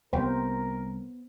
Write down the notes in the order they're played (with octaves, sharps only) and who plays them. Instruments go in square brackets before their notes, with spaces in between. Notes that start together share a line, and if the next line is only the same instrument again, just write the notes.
[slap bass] C2 G3 A#3 [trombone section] D#3 A#4 [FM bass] B3 [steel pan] C5 G5